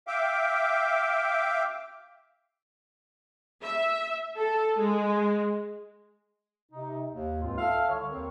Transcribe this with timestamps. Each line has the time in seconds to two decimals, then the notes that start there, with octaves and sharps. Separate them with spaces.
0.07 E5 F5 G5 D6
3.62 E5
4.36 A4
4.79 G#3
6.72 C3 D#4
7.11 D#2
7.42 C#2 G#2 C4 F4
7.57 A4 E5 F5
7.89 C2 D3 C#5
8.08 D#2 C4 A#4 C#5